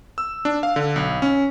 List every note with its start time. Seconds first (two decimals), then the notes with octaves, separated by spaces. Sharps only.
0.18 E6
0.45 D4
0.63 F5
0.76 D3
0.96 B1
1.22 C#4